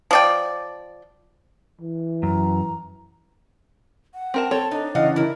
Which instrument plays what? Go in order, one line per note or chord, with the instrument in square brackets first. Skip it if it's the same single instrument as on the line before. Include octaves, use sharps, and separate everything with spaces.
[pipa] F3 D5 G5
[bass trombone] E3
[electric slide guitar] F#2 [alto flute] A#5
[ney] F#5
[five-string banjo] C4 A#4 A5
[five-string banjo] C4 C#5 [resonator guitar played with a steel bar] A4 [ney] A5
[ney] D4 [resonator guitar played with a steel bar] D#4
[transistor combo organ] C#3 E3 [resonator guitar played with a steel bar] D#5 F5 F#5
[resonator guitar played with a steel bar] E4 A#4